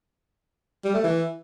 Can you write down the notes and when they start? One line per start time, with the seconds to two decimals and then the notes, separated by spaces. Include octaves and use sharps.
0.85 G3
0.94 A3
1.04 E3